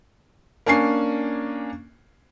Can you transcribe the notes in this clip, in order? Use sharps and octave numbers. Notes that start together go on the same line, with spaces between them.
A#3 C#4 D4 G#5 C#6 C7